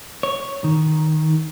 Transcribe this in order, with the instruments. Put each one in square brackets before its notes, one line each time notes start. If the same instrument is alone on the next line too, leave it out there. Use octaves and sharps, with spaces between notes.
[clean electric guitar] C#5
D#3